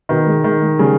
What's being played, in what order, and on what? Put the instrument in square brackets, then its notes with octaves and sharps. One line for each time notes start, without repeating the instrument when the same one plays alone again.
[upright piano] B2 B3 [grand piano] D#3
[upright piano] G#3
[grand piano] D#3 [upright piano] G#3
[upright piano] G#3
[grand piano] C#3 [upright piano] G3